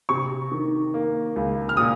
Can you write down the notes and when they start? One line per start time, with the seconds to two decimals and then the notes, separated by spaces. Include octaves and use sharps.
0.09 C3 C#6
0.52 D#3
0.94 A#3
1.36 C#2
1.69 F6
1.77 A#2 D#6